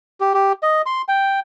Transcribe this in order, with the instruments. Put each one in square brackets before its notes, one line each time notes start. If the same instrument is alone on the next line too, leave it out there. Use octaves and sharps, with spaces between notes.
[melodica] G4
G4
D#5
C6
G5